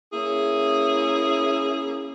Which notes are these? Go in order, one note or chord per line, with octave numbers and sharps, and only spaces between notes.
A#3 C#4 E4 G#4